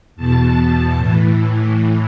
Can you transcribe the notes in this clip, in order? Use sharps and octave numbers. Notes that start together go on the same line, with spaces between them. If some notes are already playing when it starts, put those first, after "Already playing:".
E2 B2 A5
A2 E3